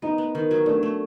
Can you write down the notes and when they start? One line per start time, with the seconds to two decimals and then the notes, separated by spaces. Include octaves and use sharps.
0.02 B3 D#4
0.18 B3
0.35 D#3
0.51 F#3
0.66 A3 D4
0.83 A3